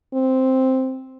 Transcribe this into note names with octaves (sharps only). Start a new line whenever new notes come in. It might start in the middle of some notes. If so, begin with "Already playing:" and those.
C4